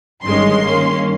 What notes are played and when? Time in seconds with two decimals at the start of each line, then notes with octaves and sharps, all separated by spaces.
0.23 G1 G2 D#3 G#3 C#4 C6
0.62 G2 D#3 A#3 C#4